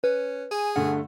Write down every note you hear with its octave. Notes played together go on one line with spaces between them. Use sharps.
C#4 B4
G#4 G#5
G2 D3 A3 F#5